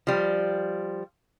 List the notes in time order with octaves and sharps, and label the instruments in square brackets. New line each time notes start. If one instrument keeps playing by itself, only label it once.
[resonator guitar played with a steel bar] F3 G3